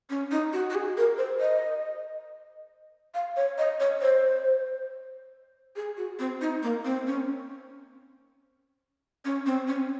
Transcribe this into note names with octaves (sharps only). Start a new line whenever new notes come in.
C#4
D#4
F#4
F#4
G#4
A#4
C5
D#5
F5
C#5
D#5
C#5
C5
G#4
F#4
C4
D#4
A#3
C4
C#4
C#4
C4
C#4